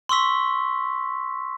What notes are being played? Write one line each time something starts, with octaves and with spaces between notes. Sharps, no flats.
C6 C#6 E6 B6